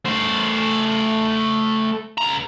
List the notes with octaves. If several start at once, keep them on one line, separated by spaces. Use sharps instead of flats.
A3 C5
C#2 A#5